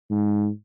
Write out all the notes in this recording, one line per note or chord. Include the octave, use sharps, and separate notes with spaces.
G#2